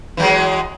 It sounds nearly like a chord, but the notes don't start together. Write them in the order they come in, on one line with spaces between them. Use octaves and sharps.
E3 F#3 G#3